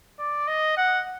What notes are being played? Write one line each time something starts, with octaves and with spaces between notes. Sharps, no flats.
D5
D#5
F#5